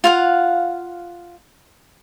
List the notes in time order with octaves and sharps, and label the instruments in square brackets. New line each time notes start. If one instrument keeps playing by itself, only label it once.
[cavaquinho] F4 F5 F#5